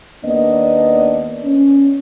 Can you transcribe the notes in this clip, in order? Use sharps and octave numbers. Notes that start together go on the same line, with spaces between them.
D#2 A#3 B3 D4 D5 D#5
C#4